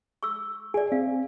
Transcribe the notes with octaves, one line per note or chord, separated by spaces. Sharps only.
C#6 E6
G#4 D5 G#5
C4 F5